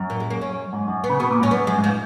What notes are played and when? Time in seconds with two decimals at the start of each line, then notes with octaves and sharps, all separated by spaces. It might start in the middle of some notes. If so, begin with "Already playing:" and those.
Already playing: F#2
0.10 A#2
0.20 G#3
0.30 A#3
0.41 C#4
0.73 G#2
0.88 F#2
1.04 B3
1.10 C#3
1.20 B2 B3
1.31 A#2
1.41 G#2 C#4
1.51 F#2 B3
1.67 F#2 G#3
1.78 G#2
1.84 F3